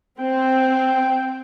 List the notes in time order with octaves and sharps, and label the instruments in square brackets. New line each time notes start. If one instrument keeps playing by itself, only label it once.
[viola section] C4 [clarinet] G5